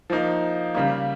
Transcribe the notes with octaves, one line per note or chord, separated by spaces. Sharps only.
F3 A#3 D#4
C#3 G3 A#3